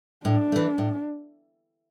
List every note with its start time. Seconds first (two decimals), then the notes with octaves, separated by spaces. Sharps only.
0.25 A2 D4
0.52 E3 A3
0.78 A2